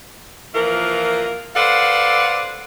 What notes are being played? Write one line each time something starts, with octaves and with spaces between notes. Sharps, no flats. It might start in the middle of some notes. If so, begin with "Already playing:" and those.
E3 F3 A#3 F4 A#4
A4 B4 C5 D5 F5 F#5